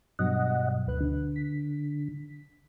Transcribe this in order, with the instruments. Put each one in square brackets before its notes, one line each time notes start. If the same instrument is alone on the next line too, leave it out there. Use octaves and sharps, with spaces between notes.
[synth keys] G2 B2 F#3 [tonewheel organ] D#5 F#5
[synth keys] D2 B4 F#6
[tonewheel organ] D3
[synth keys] B6